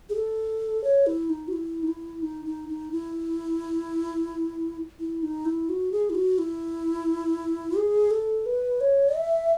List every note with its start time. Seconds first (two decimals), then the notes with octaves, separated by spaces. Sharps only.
0.09 G#4
0.15 A4
0.84 C#5
1.06 E4
1.30 D#4
1.48 F#4
1.53 E4
1.83 D#4
1.88 E4
2.22 D#4
2.45 D#4
2.69 D#4
2.92 E4
5.00 E4
5.23 D#4
5.45 E4
5.69 F#4
5.92 G#4
6.10 E4
6.15 F#4
6.38 E4
7.77 G#4
8.11 A4
8.46 B4
8.81 C#5
9.16 E5